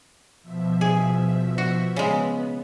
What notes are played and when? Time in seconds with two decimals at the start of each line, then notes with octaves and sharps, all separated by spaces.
0.42 B2 F3 E5
0.81 G#4
1.58 F#4
1.96 C#3 G#3 B3